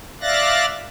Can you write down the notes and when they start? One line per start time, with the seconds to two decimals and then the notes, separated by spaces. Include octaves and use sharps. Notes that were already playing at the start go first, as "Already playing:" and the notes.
0.21 D5 E5 F5 F#6 A6 A#6